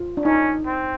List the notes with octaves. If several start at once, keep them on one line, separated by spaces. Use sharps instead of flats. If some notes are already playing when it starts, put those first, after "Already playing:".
Already playing: F4
D4
C#4 D#4
C4